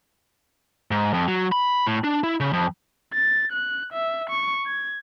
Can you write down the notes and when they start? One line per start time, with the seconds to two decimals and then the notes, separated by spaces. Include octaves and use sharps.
0.91 G#2
1.14 F2
1.28 F#3
1.52 B5
1.87 A2
2.04 D4
2.23 E4
2.40 C#3
2.53 F2
3.13 A6
3.52 F#6
3.93 E5
4.30 C#6
4.66 G#6